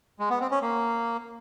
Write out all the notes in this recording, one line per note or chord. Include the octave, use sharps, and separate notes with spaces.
G#3
B3
C4
C#4
A#3